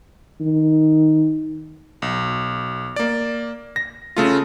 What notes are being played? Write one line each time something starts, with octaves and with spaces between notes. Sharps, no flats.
D#3
B1
A#3 D5
A#6
C#3 A3 F4